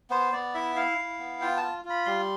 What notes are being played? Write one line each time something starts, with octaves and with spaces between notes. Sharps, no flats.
B3 C5
B3 D5
E4 E5
E4 F5
E4
B3
F4 G5
A5
F4
F4
B5
G3 C6